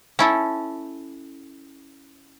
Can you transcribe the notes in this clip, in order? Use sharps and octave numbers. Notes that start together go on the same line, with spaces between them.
C#4 E4 A4